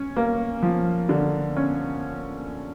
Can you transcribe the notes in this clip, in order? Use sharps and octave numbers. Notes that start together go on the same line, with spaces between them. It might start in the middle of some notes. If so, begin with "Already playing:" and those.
Already playing: C#4
A#3
F3
D3
C#4